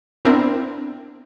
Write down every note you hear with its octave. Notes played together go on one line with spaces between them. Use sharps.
B3 C4 D4 E4 A#4